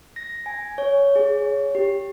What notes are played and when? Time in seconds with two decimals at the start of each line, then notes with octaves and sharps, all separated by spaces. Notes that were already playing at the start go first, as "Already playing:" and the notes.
0.16 A#6
0.46 G#5
0.78 C#5
1.16 G#4
1.37 C#5
1.75 G4